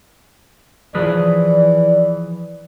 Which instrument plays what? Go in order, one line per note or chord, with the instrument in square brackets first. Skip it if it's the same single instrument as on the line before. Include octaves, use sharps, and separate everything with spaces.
[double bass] E3 [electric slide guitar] F3 G#4 B4 [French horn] D5